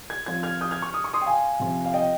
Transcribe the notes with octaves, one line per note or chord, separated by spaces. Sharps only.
G#6
F3 C4 F4 G#6
F6 G#6
D#6 G6
F6 G#6
C#6 F6
D#6
C#6
C6 D#6
G5
F5 G#5
C3 F3 C4 F4
F5
D#5 G5